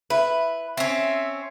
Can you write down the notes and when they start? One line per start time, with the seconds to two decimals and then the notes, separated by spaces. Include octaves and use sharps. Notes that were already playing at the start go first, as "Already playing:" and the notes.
0.10 E4 B4
0.77 C4 C#4 E5